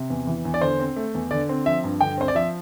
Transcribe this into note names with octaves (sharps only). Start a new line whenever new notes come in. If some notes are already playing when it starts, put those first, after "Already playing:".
Already playing: C3
E2
E3
E2
D5
D3 C5
C4
A3
E2
D3 D5
C4
F3 E5
G2
D3 G5
C4 C5
D5
F3 E5